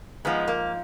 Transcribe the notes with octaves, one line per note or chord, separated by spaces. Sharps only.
G#2 F3 G#3 B3
A#3